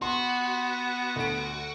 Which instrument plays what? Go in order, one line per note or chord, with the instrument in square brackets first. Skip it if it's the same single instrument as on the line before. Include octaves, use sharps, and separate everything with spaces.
[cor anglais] B3 [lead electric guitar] F#4 [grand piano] C6
[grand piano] D2 D7